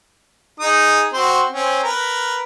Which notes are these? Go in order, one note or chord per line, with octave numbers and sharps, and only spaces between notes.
D#4 G#4 D#6
C4 F#4 C5
C4 C#4
A#4 B4